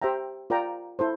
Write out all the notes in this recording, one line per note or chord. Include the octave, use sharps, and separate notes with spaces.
G4 C5 E5 G5 A#5
F4 A#4 D5 G5 A#5
E4 A4 C5